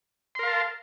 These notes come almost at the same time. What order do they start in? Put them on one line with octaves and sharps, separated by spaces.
C6 A#4 F5 A5